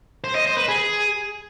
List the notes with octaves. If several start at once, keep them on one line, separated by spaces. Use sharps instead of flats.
C5
D#5
C5
B4
G#4